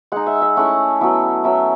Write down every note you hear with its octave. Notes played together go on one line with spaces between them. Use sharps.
G#3 D#4 F#5
E5
E5
A3 C#4 E4 F#5
F#3 B3 E4
F#3 C#4 E4 E5